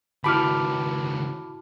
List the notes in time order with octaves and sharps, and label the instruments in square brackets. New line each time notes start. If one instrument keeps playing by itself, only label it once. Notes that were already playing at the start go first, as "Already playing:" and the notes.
[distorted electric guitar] C#2 D#3 [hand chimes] E4 F#4 A5 [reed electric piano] B5 D6 F6